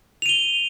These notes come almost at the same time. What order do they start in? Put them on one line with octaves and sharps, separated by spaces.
F7 D#7 G7